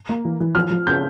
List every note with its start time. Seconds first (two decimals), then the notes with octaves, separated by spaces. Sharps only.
0.09 A#3
0.25 E3
0.40 E3
0.55 F3 F6
0.70 F3
0.87 C#3 G6